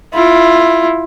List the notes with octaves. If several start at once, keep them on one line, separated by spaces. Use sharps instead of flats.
E4 F4